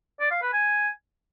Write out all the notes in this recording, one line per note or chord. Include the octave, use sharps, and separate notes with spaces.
D5
F5
B4
G#5